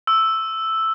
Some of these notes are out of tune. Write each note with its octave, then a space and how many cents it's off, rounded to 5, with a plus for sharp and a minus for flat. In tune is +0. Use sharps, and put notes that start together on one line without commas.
C#6 -25 E6 +0